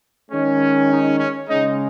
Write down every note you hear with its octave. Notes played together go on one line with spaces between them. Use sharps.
D#3 G#3 C#4
D#4
C#4
C#3 G#3 C#4 D#4